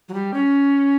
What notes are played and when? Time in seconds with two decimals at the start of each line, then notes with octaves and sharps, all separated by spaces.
0.09 F#3
0.14 G3
0.34 C#4